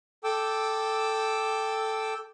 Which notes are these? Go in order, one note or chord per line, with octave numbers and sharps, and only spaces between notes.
A4 G5 D6 E6